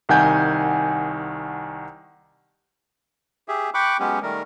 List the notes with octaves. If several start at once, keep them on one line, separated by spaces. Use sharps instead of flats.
C2 D#3 F#5 G#5 G6
G4 G#4 E5
G5 B5 C#6 D6 F#6
F#3 G#3 B3 C#4 G4
D#3 G3 A3 A#4